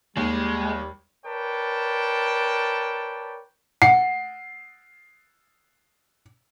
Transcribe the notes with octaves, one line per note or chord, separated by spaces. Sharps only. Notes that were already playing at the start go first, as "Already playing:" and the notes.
D#2 G3 G#3
A#4 B4 C#5 D5 G5 A5
F#5 C7